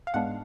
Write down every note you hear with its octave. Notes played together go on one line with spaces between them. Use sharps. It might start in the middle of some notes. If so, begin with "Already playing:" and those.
F5
G#2 G#3 B3 D4 F#5